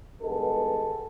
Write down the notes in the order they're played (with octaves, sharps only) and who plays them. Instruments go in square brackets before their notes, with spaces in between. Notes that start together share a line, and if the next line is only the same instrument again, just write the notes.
[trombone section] G2 D#3 G#3 B3 A4